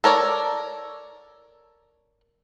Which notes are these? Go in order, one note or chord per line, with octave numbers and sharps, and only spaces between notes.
A4 A#4 C#5 D5